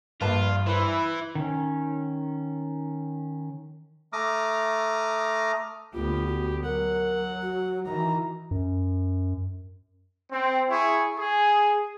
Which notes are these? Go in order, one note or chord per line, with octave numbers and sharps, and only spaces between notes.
A#1 G2 F4 B4 A5
E3 E4 B4 C5
D#3 C#4
A3 A#5 D6 D#6 F6
D2 B3 F4 G4
F#4
F#3 A#4 F#5
F#4
D#3 E3 F#4 A#5
F#2
C4
E4 G#4 C#6
G#4